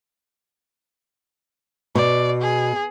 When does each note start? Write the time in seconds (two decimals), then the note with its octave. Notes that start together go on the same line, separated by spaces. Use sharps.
1.95 B2 D5
2.42 G#4